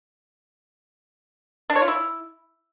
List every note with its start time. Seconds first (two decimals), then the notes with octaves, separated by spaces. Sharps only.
1.70 D4
1.76 C#5
1.82 F4
1.88 E4